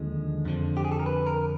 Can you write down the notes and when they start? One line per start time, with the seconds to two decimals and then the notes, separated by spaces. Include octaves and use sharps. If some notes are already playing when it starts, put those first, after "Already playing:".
Already playing: D#2 D3 F3 G#3
0.45 F2 D3 F3
0.77 G4
0.85 G#4
0.92 A4
1.00 A#4
1.06 B4
1.27 A#4